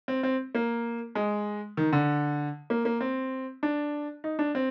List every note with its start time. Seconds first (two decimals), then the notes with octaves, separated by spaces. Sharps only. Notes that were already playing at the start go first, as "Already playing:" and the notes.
0.08 C4
0.23 C4
0.55 A#3
1.15 G#3
1.77 D#3
1.93 D3
2.70 A#3
2.85 A#3
3.01 C4
3.63 D4
4.24 D#4
4.39 D4
4.55 C4